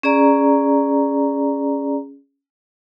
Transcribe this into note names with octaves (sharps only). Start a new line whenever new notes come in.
C#4 G#4 D5 A#5